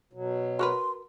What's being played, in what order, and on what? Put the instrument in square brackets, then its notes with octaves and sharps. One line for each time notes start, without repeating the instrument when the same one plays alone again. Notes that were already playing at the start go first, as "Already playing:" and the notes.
[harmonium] B2 F#3
[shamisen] F#4 A#4 B4 [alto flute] C6